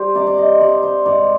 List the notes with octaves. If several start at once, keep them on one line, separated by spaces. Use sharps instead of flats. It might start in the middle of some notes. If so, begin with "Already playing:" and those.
Already playing: G3 G4 C5
C3 D5
D5
D#5
G3 D5
C5
G#2 D5